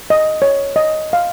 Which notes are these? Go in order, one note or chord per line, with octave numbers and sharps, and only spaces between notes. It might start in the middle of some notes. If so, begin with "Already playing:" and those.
D#5
C#5
D#5
F5